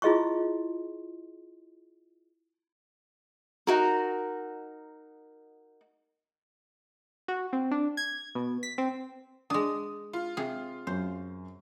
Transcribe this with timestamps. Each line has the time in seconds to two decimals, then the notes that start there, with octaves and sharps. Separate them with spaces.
0.02 E4 F4 G#4 D#5 C6 C#6
3.67 D#4 F#4 A#4
7.28 F#4
7.53 C4
7.71 D4
7.97 G#6
8.35 B2
8.63 B6
8.78 C4
9.50 G#3 D4 D#6
10.13 F4
10.37 C3 G#4
10.87 F#2 C5